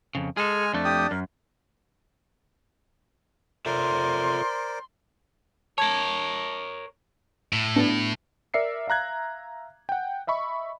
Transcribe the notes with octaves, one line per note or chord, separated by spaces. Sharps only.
F2 C#3
G#3 G#4 A4 G#5 F6
F2 A3 D4
G4 G5 D#6
F#2 A#4
F4 A4 A#4 C5 D5 E5 C6
A#4 C#5 A5 G#6
A2
B3 D4 A5
A#4 D5 E5 C7 C#7
E5 F5 A#5 F#6 G#6
F#5 G5
D#5 E5 B5 C#6